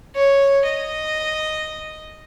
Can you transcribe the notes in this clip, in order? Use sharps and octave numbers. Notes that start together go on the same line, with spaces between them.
C#5
D#5